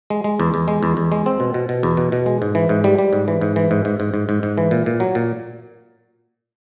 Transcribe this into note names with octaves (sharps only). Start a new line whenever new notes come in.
G#3
G#3
E2
E2
G#3
E2
E2
G#3
C4
B2
B2
B2
E2
B2
B2
G#3
G#2
E3
G#2
G3
G3
G#2
E3
G#2
E3
G#2
G#2
G#2
G#2
G#2
G#2
E3
A#2
A#2
F#3
A#2